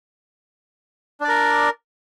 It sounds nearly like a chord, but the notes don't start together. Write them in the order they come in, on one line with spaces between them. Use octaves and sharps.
D4 D5 A#4